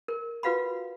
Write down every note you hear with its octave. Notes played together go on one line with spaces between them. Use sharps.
A#4
F4 F#4 B4 F5 F#5 B5